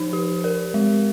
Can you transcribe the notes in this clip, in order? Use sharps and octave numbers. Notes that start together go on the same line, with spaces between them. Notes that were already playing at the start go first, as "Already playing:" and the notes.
Already playing: F3 D#4 C5
G4
A#4
G#3